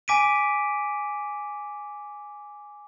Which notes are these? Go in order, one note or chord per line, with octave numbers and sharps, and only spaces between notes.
G#5 D6 B6 D7 D#7